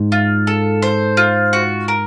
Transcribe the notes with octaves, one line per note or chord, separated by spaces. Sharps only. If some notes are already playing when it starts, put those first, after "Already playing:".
Already playing: G#2
F4
A4
C5
F4
F#4
A#4